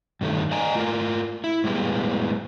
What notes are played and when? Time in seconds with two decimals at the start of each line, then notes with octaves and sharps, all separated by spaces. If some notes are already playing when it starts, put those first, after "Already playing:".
0.21 G2 D#3 A3
0.51 D5 D#5 G#5 A#5
0.75 A3 F4 A#4
1.44 E4
1.64 A2 G3 G#3 B3